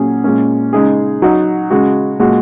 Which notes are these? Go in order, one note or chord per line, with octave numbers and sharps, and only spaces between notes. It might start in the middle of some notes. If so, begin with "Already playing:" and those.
Already playing: A#2 F#3 C#4 G#4
A#2 G#3 C#4
C#3 G#3 D#4 G#4
F#3 D#4 F#4
C#3 G#3 F#4
A#2 G#3 F#4